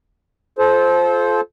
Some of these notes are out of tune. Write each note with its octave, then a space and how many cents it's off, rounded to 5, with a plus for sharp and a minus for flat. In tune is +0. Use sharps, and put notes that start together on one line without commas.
F4 +0 A4 -30 C5 +0